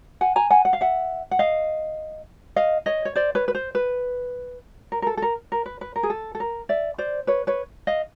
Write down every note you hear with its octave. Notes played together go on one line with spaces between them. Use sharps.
F#5 G#5
G#5 A#5
F#5 G#5
F#5
F5
E5 F#5
F#5
D#5 F5
D#5 F5
C#5 D#5
C#5
C5 D5
B4 C#5
B4
C5
B4
A#4
A#4
A4
A4
A#4
A#4
B4
B4
A#4
G#4
A4
A4
A#4
D5 E5
C5 D5
B4 C#5
B4 C#5
D#5 F5